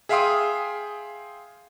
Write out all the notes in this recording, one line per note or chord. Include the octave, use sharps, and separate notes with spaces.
G#4 E5 F5 G5 C6 D#6